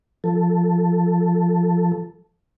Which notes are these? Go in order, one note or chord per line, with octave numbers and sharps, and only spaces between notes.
F3 A4